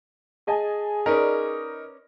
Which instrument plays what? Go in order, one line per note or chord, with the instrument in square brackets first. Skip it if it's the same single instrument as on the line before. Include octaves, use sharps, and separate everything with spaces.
[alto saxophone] G#4 [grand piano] D#5 G#5 A5
[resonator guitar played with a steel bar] C#4 B4 D5 [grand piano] D#4 [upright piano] A#4